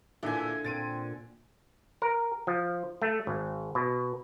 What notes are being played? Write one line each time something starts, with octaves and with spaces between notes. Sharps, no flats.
A#2 D3 E3 E5 G#5
A#2 C4 A6 D7 D#7
A#4
F3
A3
G#1
B2